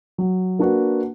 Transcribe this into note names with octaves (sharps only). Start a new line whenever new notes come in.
F#3
A#3 D4 F#4 B4